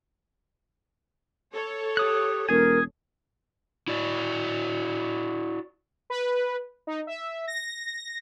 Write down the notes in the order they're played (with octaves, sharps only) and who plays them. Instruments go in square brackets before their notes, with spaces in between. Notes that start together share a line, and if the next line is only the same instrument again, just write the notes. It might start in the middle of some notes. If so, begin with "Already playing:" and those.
[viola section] A4 C#5
[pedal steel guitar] G4 D#6 F#6
[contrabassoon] E1 [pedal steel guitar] G#4 G#5 [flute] A#4
[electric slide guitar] E4 F#4 D5
[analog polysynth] B4
D#4
E5
A#6